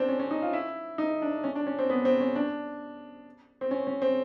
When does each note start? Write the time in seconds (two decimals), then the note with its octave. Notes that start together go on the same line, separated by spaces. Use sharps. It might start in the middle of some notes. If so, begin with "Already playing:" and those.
Already playing: C4 D4
0.08 C#4
0.19 C#4
0.31 D#4
0.42 F4
0.53 E4
0.98 D#4
1.22 D4
1.44 C#4
1.55 D4
1.67 C#4
1.79 C4
1.90 B3
2.05 C4
2.21 C#4
2.35 D4
3.61 C4
3.71 C#4
3.87 C#4
4.02 C4